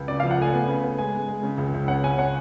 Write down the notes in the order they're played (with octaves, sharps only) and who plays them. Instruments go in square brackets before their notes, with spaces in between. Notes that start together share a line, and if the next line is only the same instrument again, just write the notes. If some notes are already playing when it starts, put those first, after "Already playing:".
Already playing: [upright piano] C#2
[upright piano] C#3 [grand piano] D5
[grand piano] F5
[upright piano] F3
[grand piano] F#5
[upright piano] A3 [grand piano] G#5
[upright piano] B3
C#3
B3
[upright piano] G#3 [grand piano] G#5
[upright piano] G#3
G#3
C#3
C#2
C#2
[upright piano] C#4 [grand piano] F#5
[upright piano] C#4 [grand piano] G#5
[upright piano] C#4 [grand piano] F#5